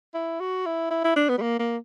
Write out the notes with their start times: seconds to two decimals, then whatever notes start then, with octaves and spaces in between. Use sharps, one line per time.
0.14 E4
0.40 F#4
0.66 E4
0.91 E4
1.04 E4
1.16 D4
1.29 B3
1.37 G3
1.42 A#3
1.59 A#3